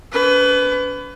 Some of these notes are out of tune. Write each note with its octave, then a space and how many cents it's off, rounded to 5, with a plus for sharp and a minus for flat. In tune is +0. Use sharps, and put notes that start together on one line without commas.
D4 -45 B4 +25